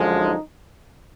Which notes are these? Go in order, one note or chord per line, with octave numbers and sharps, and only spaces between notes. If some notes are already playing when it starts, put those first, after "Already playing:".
Already playing: F#2 D3 F3 G#3
D#4